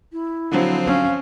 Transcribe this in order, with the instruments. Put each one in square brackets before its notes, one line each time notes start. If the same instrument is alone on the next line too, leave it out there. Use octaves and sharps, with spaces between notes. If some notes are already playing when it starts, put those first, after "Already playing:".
[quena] E4
[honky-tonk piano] D3 F#3 [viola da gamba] F3 C4
[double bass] C#4 [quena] F5